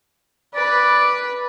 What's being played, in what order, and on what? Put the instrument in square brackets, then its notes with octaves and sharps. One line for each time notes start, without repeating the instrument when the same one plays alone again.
[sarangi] B4 [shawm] D5